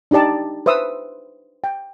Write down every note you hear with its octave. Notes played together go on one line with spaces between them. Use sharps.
D4 D#4 G4 D5 A5
B4 C5 E5 D#6 E6
G5